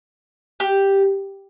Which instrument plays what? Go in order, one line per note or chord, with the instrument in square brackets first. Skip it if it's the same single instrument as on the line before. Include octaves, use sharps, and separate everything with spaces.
[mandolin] G4